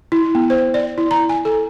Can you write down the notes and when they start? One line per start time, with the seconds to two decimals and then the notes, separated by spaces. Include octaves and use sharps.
0.12 E4
0.35 B3
0.50 C5
0.74 D5
0.98 E4
1.11 A#5
1.29 G#5
1.45 A4